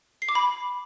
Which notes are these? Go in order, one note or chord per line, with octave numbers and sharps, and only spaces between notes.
C7
D6
B5